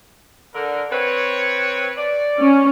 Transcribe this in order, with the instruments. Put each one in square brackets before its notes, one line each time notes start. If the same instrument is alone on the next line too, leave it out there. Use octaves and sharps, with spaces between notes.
[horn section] D3 A#4
C4 B4 C#5
D5
[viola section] C#4